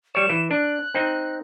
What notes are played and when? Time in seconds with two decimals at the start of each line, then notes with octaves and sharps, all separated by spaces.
0.15 G3 C#5 E7
0.29 E3
0.51 D4 F#6
0.94 C4 D#4